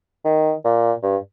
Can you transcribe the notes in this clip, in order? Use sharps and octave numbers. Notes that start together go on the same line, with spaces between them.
D#3
A#2
G2